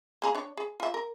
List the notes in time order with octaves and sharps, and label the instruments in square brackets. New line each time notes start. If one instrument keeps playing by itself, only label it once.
[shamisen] A#3 G#4 A#5
D4 C#5
G#4
F4 E5
A#4